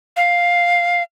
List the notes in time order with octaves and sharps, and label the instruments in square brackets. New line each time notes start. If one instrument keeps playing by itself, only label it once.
[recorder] F5